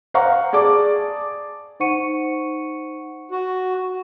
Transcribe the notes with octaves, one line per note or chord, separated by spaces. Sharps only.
C5 F5 F#5 A#5 C#6
G#4 D5 A5 D6
D#4 C5 F#5 C#6 C#7 D#7
F#4